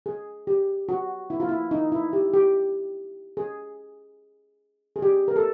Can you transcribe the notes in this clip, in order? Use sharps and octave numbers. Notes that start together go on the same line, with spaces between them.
G#4
G4
F#4
E4
F4
E4
D#4
E4
G4
G4
G#4
G#4
G4
A#4
A4